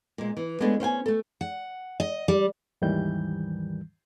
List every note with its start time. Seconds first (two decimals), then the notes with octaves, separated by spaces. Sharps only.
0.18 A#2 G#3
0.37 E3
0.61 G#3 A3 B3 C#4 D4
0.80 C#4 C5 G5 G#5
1.06 A3 A4
1.41 F#5
2.00 D#5
2.28 G3
2.82 D#2 G#2 D#3 E3 G3 G6